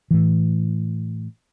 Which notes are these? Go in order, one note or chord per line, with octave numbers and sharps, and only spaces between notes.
A2 E3